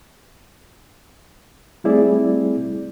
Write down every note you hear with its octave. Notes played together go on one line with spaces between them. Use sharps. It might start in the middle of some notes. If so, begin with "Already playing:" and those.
G3 A3 C4 E4 G#4 D5